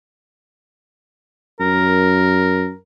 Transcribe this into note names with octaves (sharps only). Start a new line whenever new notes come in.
F#2 A#4